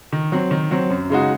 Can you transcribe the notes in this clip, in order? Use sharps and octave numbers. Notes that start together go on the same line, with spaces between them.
D#3
F#3 C4
D#3
F#3 C4
F#2
C#3 G#3 D#4 F#4